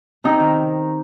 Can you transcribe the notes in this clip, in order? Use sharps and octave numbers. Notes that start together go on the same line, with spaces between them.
C3 D#4
D#3